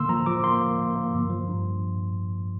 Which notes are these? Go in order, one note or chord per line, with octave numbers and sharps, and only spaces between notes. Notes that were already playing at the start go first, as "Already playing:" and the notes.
Already playing: D3 A#3 C6 E6
F3 A#5
F3 D6
A#3 C6
A#3
A#3
A#3
G2
F3
G2